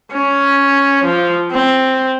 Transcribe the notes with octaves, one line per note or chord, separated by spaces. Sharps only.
C#4
F3
C4